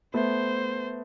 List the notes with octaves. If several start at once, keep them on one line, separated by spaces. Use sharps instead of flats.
A3 B3 C5